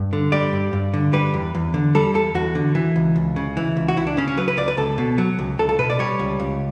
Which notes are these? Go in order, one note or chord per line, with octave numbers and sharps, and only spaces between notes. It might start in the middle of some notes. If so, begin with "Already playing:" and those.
Already playing: G2
D3
G3 D5
G2
G2
D3
G3 B4
E2
E2
D3
G3 A4
E2 A4
E2 F#4
D3
E3
C#2
C#2
C#3
E3
C#2
F#4
C#2 E4
D4
C#3 C#4
C#4
F#3 B4
B4
C#2 D5
B4
C#2 A4
B2
F#3
C#2
C#2 A4
A4
B2 B4
D5
G3 C#5
C#2
C#2